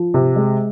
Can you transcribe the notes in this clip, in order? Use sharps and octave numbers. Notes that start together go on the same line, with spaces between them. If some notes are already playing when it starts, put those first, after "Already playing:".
Already playing: F3
C3
G#3